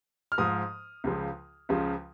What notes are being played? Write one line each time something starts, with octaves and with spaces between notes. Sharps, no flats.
F6
G#2 F3 D#6
C#2 C#3 F3
C#2 C#3 F3